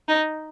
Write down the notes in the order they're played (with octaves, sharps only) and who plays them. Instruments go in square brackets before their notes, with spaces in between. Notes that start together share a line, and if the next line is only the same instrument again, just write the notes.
[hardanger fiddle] D#4